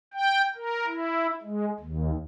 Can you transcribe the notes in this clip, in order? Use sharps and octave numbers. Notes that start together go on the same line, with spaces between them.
G5
A#4
E4
G#3
D#2